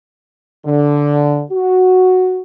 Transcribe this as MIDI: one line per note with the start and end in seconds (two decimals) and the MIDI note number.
0.66 1.42 50
1.51 2.42 66